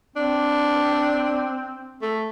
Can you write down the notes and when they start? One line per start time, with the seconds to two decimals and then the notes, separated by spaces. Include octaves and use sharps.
0.16 C4 D4
2.02 A3